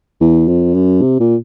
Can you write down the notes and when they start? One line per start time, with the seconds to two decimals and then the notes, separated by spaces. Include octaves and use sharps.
0.21 E2
0.48 F2
0.74 F#2
1.02 C3
1.20 A#2